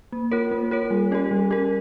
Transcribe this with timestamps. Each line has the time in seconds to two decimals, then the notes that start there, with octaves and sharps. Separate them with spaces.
0.12 A#3
0.31 F4 A#4 C#5
0.51 A#3
0.71 F4 A#4 C#5
0.91 G3
1.11 C#4 G4 A#4
1.31 G3
1.50 C#4 G4 A#4